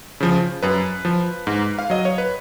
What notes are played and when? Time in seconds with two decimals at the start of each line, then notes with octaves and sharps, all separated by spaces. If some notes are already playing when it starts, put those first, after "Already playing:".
0.20 C#3 F3
0.63 F#2 B4
1.05 F3
1.47 G#2
1.79 F5
1.90 F#3 D#5
2.05 C#5
2.18 B4